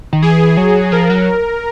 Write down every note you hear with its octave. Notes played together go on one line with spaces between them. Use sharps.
D#3
E3 G#4
F#3
F3 A#4
F#3